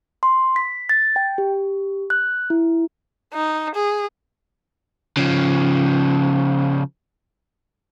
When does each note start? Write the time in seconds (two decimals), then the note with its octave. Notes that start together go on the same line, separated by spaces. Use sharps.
0.23 C6
0.56 B6
0.89 A6
1.16 G5
1.38 G4
2.10 F#6
2.50 E4
3.34 D#4
3.75 G#4
5.17 C#3 F3